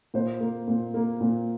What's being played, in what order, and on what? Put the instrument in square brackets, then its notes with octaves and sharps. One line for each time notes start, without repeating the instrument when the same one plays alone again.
[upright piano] A#2 C5
A#3
A#2
A#3
A#2